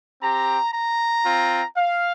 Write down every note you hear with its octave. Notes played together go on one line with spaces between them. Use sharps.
C4 G4 A#5
A#5
C4 F4
F5